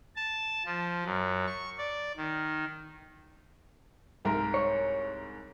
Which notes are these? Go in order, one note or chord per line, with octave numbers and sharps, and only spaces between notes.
A5
F3
F#2
C#6
D5
D#3
C2 G#2 A#4
C#5